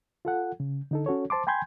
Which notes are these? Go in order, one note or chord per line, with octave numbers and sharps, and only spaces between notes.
F4 A4 F#5
C#3
D3 D#4 A4
C#4 F#4 A4 C#5
C5 A5 C6 D6
G5 G#5 B5 C6 G6 G#6